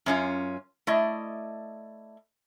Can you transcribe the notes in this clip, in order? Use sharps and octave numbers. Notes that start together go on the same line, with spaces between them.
F#2 C#4 F4
A3 E4 D5 D#5